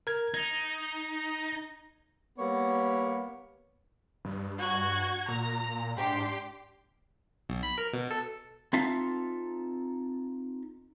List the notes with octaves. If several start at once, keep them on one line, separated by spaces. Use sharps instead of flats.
A#4 G#6
D#4 G#6
G3 A#3 B3 A#4 C#5
G2
F#4 G#6
A#2 A#5
G#2 D4 G4 C6
B1
B5
A#4
B2
A4
C4 D#4 F4 A4 E5 F5